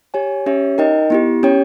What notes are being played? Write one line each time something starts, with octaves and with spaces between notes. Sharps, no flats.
G4 C#5 G#5
C#4 G4 C#5 E5
D#4 A#4 D#5 G5
B3 E4 G4
C#4 G4 C#5 G5